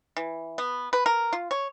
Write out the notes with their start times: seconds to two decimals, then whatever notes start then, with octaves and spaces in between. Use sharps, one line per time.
0.17 E3
0.58 B3
0.93 B4
1.06 A#4
1.33 F4
1.51 C#5